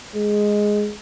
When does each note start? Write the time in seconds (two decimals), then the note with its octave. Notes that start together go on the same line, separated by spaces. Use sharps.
0.16 G#3